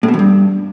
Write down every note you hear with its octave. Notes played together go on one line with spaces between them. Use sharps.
A2
B2
F2
G2